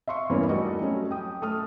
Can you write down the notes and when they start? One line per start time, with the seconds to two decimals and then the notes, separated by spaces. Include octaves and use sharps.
0.08 E5 F5 C6 C#6
0.30 E2 G2 A#3 B3 C#4 E4
0.49 G3 A3 D#4 F#4 A4 D#5
0.81 F#3 A3 C#4
1.11 G5 D#6
1.42 A3 D#6 F6